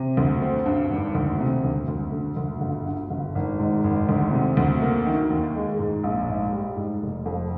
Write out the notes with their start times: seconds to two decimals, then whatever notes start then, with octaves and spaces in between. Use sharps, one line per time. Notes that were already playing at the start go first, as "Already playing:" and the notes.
Already playing: C3
0.17 D2
0.42 C4
0.66 G2
0.90 G#1
1.15 D2
1.40 C3
1.64 D2
1.88 D2
2.12 D3
2.37 D2
2.61 G1
2.86 G2
3.11 G1
3.35 G#1
3.59 G#2
3.84 G#1
4.09 D2
4.32 C3
4.57 D2
4.82 A#3
5.06 D#3
5.30 D#2
5.55 G#3
5.79 G#2
6.03 A#1
6.28 G#2
6.53 G3
6.76 G#2
7.02 F1
7.26 F2